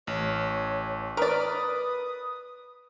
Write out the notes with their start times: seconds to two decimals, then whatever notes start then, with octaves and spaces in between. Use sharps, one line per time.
0.07 A1 C#5
1.17 A#4 B4 D5 D#6